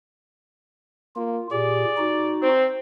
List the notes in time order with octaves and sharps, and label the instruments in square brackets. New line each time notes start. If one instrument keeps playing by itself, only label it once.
[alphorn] A#3 [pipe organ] F4
[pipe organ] A#2 G4 [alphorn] G#4 [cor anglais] D5
[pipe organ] D#4 F#4
[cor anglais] C4 [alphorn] C5